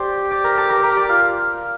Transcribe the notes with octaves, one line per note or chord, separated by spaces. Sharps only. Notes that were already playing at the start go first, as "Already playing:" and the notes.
Already playing: G4 C5 D5 C6 D6
D5 D6
A#4 A#5
A4 A5
A#4 A#5
A#4 A#5
D5 D6
F4 F5 F6